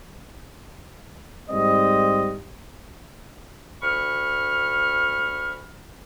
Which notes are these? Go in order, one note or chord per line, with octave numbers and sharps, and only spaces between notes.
G#2 G3 C4 D#5
D2 B5 C#6 F6